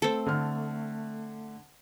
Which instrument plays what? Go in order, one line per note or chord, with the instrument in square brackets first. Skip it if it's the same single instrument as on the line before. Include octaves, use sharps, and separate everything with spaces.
[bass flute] A3 [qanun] C4 A4
[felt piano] D3 F6